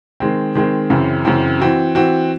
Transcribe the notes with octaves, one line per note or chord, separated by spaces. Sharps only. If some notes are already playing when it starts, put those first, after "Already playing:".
D#3 G#3 C4
D#3 G#3 C4
F#2 C#3 E3 C4
F#2 C#3 E3 C4
E3 C4 F#4
E3 C4 F#4